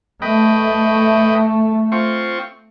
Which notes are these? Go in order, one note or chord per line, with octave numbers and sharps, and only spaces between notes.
A3 B4 D#5 G5
C4 F4 C#6